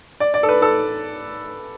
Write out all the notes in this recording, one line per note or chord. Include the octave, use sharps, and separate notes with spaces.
D5
D5
A4
B4
A4